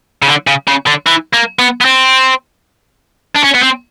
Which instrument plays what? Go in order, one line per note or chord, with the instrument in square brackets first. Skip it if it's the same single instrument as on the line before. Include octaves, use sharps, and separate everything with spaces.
[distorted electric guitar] C#3
D3
C#3
C#3
D3
E3
A#3
B3
B3
C4
D4
C#4
B3
C4